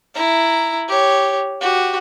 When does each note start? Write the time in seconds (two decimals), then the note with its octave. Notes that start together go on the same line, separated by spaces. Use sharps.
0.14 E4 A#5
0.88 G4 C#5
1.61 F#4 G4